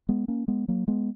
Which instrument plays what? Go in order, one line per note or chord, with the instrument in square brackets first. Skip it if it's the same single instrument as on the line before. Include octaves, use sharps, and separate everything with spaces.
[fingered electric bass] G#3 B3
A#3 C#4
G#3 B3
F#3 A#3
G#3 B3